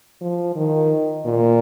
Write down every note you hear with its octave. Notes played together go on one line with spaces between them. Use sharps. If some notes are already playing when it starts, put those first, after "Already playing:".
F3
D#3
A#2